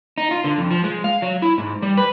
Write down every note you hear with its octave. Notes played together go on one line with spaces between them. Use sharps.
D#4
F4
D3
F2
F3
G#3
F5
F#3
E4
G#2
G3
B4